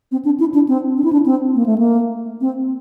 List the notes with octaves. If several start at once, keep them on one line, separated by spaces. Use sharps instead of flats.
C4
D4
E4
D4
C4
D4
E4
D4
C4
A#3
A3
A#3
C4